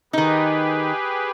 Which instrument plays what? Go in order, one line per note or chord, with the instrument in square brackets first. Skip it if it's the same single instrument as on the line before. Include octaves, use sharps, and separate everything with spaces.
[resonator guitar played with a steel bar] D#3 D#4 [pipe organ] G4 G#4 B4